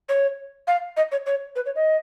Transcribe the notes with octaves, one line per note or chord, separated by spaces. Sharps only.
C#5
F5
D#5
C#5
C#5
B4
C#5
D#5